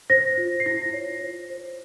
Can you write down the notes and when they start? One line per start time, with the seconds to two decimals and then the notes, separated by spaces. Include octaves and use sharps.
0.10 C5 A#6
0.37 F4
0.60 C7
0.66 E4 A#6
0.93 C#5
1.21 C5
1.50 C5